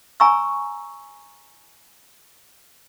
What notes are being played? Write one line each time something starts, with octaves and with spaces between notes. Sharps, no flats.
G#5 A#5 C#6 E6